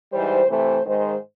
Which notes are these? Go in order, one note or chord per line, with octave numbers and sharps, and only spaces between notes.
G#2 E3 G3 C5
C3 E3 A3 C5
G#2 D#3 G#3 C5